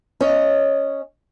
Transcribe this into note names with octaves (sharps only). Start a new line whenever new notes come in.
C#4 C#5 D#5